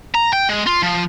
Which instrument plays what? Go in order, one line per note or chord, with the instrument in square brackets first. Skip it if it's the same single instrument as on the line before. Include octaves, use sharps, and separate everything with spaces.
[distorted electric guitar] A#5
G5
G#3
F4
F3